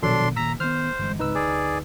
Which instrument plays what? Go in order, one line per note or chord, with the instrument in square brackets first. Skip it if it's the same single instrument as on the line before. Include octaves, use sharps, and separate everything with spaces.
[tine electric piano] A#1 F#3 A4 [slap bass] B2 D#3 [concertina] D4 C6
[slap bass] A#2 D#3 [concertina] A#5 [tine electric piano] E6 B6
[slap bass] D#3 B3 [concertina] C5 [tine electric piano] F6
[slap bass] G1 E3 G#3
[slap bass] G#1 C#2 [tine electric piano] D#4 B4 E6
[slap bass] D2 [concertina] G#4 D5